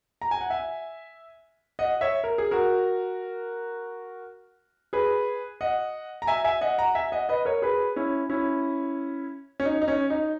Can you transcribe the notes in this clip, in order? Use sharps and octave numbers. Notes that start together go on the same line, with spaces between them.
A#5
G#5
F#5
E5 G#5
D#5 F#5
C#5 E5
A#4
G#4
F#4 A#4
G#4 B4
D#5 F#5
A#5
E5 G#5
E5 G#5
D#5 F#5
F#5 A#5
E5 G#5
D#5 F#5
B4 D#5
A#4 C#5
G#4 B4
C#4 E4
C#4 E4
C#4
D#4
D#4
C#4
D#4